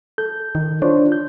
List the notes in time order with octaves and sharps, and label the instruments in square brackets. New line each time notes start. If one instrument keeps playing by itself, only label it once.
[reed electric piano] A4 G6
[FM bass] D#3
[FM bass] D4 [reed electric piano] F4 C5 C#5
[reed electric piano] G6